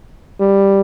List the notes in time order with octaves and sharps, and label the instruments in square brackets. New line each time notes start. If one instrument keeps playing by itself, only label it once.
[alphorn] G3